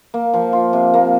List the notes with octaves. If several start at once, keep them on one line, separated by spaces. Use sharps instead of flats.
A#3
F3
F4
C3
A#3